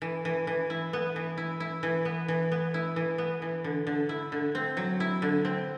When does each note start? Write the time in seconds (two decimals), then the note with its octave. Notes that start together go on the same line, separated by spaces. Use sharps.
0.02 E3
0.25 E3
0.47 E3
0.70 E4
0.93 B3
1.16 E3
1.38 E4
1.60 E4
1.83 E3
2.05 B3
2.28 E3
2.52 B3
2.74 E4
2.96 E3
3.18 B3
3.42 E3
3.64 D3
3.87 D3
4.09 E4
4.32 D3
4.55 C4
4.77 F#3
5.00 E4
5.22 D3
5.45 C4